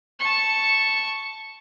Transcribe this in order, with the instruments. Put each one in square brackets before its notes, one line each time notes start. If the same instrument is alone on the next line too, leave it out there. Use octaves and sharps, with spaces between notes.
[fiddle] A5 C#6